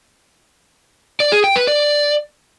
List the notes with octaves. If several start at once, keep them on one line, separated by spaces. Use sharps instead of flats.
D5
G#4
G5
B4
D5